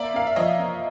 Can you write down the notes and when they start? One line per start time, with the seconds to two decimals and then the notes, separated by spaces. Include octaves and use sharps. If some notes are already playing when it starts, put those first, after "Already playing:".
Already playing: A#3 D5 E5
0.14 A#3 F5
0.27 E5
0.36 F3 C#5 D#5
0.59 A#3